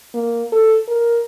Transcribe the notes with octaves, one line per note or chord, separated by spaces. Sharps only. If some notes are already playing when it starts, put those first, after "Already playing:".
A#3
A4
A#4